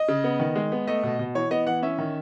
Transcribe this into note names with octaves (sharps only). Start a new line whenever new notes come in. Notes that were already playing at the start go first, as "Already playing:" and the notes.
Already playing: D#5
C#3
B3
D#3
G#3
B3
A3 D#5
B2
B2
E3 C#5
B3 D#5
E3 F#5
C#4 E5
D#3